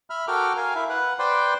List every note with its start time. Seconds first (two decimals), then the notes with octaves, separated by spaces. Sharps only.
0.10 E5 B5 F6
0.28 F#4 A4 A#4 G5 D6 F6
0.57 A#4 F5 G#5
0.75 E4 E5 F5
0.89 B4 F#5
1.19 B4 C5 D5 G5 C6